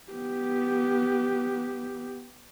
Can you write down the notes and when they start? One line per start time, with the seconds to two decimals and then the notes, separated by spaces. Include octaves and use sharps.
0.12 B3 G4